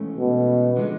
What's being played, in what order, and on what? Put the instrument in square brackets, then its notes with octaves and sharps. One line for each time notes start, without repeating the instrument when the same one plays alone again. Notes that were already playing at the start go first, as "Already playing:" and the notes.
Already playing: [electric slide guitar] G#2 E3 A3 C#4
[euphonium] B2
[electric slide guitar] D3 F3 G#3